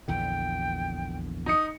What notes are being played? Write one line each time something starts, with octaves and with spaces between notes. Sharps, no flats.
A#1 E2 D3 G5
D#4 D#6 C#7